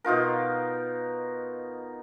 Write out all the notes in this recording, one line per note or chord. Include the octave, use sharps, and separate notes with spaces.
B2 D#4 F4 A#4